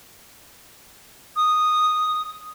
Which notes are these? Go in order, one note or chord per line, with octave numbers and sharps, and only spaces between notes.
D#6